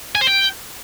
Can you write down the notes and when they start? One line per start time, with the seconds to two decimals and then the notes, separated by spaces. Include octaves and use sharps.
0.15 G#5
0.21 C5
0.27 G5